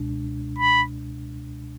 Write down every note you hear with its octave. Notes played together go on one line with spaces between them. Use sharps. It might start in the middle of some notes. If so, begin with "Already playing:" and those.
Already playing: C#2 B2 G#3 D4
B5